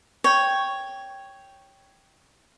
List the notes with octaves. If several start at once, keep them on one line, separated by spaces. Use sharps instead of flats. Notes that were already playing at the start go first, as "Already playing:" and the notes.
C#5 G5